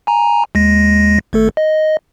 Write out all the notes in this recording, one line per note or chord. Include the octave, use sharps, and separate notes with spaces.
G#5 A#5
D#2 G#3 A#6
G#1 A3 A4
D#5